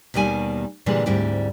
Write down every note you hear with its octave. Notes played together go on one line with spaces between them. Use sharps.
D#2 B2 D#3 G3 G#5
A#2 D3 E3 G3 G#3
D2 G#2 G3 C4 E4 D5